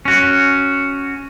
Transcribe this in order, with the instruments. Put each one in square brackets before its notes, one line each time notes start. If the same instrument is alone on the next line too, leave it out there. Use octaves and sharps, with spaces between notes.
[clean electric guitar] C#4 F#4